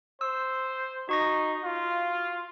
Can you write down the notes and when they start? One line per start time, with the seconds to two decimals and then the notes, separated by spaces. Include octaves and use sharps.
0.21 C5 E6
1.09 D#4 F#4 C#6 A#6
1.64 F4